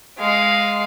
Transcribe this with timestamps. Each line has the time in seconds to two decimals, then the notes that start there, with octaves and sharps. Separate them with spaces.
0.18 G#3 F5